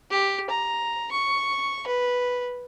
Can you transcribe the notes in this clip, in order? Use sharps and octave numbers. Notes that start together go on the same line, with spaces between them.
G4
A#5
C#6
B4